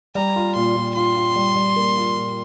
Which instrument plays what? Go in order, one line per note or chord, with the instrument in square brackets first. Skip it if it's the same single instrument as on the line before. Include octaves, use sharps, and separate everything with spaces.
[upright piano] G3 [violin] A#5
[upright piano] F4
[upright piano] A#2 [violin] C6
[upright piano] A#2
[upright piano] F4 [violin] C6
[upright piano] F4
G3
G3
A#3
F4
A#2